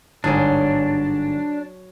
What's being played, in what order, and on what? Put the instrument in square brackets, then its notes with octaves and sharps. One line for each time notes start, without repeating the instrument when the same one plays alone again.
[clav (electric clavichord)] G1 G#2 G#4 [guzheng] F#3 [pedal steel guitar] D4